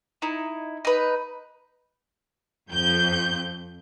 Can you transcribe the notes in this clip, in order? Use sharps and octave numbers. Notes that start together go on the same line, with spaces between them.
D#4 E4
D#4 B4
F2 G6